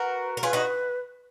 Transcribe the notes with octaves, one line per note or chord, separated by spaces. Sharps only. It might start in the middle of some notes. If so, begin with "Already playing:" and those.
Already playing: F#4 A#4 B4
A#4
F4 G#4 B4
D#4 F#4